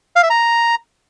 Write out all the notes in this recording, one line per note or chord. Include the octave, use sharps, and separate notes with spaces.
F5
E5
A#5